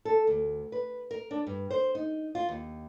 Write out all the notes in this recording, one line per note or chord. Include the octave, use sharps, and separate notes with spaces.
A4
D2
B4
A#4
D4
G2
C5
D#4
F4
D#2